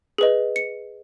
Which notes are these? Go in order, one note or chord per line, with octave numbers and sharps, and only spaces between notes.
G#4 B4 D#5
C#7